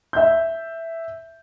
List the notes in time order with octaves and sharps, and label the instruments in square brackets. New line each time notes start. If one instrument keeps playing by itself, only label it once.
[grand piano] E5 G6